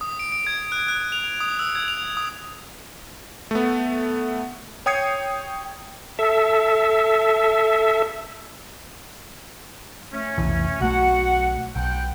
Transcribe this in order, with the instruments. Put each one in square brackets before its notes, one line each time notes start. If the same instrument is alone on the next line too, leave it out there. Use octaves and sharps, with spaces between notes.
[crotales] D#6
D7
D7
G#6
F#6
F#6
F7
D#6
E6
G#6
F7
D#6
[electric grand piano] A3 B3
C#5 G5 D#6 G#6 C7 C#7
[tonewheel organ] A4 E5
[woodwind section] A3 C#4
[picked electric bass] F1 B1 E3
[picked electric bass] B1 A3 [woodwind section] F#4 F#5
[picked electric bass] B1 [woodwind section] F#5 G5